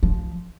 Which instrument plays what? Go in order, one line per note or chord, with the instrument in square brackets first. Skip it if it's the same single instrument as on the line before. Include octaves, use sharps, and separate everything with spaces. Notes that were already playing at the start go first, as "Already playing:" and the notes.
[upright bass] F3